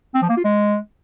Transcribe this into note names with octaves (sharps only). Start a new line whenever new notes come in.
C4
F3
A#3
F4
G#3